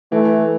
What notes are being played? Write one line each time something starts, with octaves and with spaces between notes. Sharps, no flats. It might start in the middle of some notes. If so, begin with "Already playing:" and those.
E3 A3